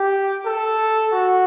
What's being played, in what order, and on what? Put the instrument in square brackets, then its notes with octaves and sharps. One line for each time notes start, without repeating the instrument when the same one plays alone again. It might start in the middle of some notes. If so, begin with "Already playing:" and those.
Already playing: [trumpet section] G4
A4
F#4